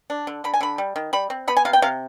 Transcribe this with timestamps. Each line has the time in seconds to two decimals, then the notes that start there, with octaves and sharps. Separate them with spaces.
0.10 D4
0.27 D3
0.44 D3 B5
0.54 G#5
0.61 D3 B5
0.78 G3
0.96 D#3
1.13 G3 B5
1.30 C4
1.48 B3 B5
1.57 G#5
1.65 C3 F5
1.73 G5
1.82 C3 F5